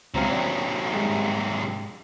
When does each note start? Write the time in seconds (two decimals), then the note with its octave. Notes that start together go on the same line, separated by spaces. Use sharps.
0.14 C#2 C3 F#3 C4 F5
0.29 C4 D4 F#4
0.94 G#2 G3 G#3